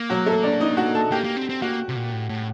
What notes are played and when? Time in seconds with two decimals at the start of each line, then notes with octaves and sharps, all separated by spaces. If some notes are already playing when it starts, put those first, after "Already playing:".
Already playing: A#3
0.10 F#3 F#4
0.26 A3 A4
0.43 D4 D5
0.61 D#4 D#5
0.77 F#4 F#5
0.95 A4 A5
1.12 A#3 G4 G5
1.24 A#3
1.37 C4
1.49 C4
1.62 A#3 F#4 F#5
1.89 C3
1.95 A#2
2.13 A2
2.29 A2